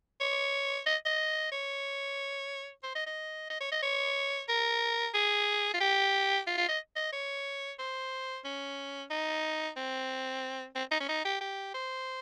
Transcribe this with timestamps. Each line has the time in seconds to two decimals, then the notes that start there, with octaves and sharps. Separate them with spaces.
0.20 C#5
0.86 D#5
1.06 D#5
1.52 C#5
2.83 C5
2.95 D#5
3.06 D#5
3.50 D#5
3.61 C#5
3.71 D#5
3.83 C#5
4.49 A#4
5.14 G#4
5.74 F4
5.80 G4
6.47 F4
6.57 F4
6.69 D#5
6.96 D#5
7.13 C#5
7.79 C5
8.45 C#4
9.10 D#4
9.77 C4
10.75 C4
10.91 D#4
11.00 C#4
11.09 D#4
11.25 G4
11.41 G4
11.74 C5